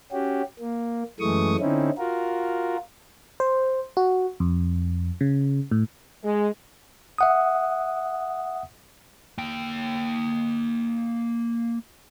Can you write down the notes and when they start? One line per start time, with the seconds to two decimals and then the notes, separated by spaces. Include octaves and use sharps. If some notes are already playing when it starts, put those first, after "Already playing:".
0.12 C#4 F#4 G4
0.59 A#3
1.20 F#2 E3 G#3 A3 C#6 D#6
1.60 D3 C4 C#4 D#4 E4
1.98 F4 F#4 A#4
3.40 C5
3.97 F#4
4.40 F2
5.21 C#3
5.71 A2
6.24 G#3
7.18 E5 F#5 D#6
9.38 A#3 G5